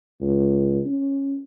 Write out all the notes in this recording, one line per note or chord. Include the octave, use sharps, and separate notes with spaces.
C#2
C#4